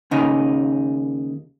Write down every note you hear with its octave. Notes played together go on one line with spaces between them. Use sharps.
D#2 C#3 D#4